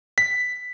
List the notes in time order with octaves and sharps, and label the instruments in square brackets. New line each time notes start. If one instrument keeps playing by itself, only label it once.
[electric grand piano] B6